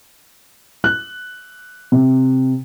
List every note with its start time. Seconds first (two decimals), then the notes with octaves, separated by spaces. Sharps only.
0.84 F#6
1.92 C3